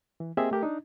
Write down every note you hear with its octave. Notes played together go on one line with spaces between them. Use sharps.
E3
A#3 C4 G4 G#4 D#5 E5
A3 G4 A#4
D4 D#4